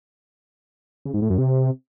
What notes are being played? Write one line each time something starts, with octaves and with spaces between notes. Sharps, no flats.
C#3
G#2
A2
F#2
C3